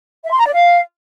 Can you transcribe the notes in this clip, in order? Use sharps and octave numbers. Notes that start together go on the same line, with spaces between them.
E5
C6
A#5
D5
F5